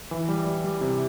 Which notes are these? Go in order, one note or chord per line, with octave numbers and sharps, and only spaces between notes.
E3
G3
G3
G3
C3